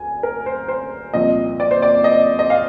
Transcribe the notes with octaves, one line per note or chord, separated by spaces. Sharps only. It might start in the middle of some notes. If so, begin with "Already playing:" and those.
Already playing: D2 G#5
A#4
C5
C5
C2 A#2 F3 D#5
D5
C5
D5
D#5
D#5
F5